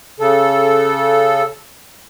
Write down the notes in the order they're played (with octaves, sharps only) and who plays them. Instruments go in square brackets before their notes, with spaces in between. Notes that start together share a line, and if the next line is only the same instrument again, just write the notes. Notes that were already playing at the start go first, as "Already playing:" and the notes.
[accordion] C#3 A4